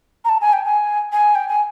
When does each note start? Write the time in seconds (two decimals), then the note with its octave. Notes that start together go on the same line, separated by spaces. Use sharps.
0.25 A#5
0.29 A5
0.41 G#5
0.53 G5
0.65 G#5
1.12 G#5
1.35 G5
1.48 G#5